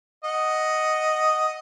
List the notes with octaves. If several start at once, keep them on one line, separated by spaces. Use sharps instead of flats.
D#5 F#5